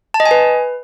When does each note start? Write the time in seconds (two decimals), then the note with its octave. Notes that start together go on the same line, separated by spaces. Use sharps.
0.14 A5
0.20 D#5
0.25 G#5
0.31 B4